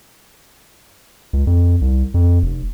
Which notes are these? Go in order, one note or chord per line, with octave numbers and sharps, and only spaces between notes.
C#2
F2
C2
F2
F1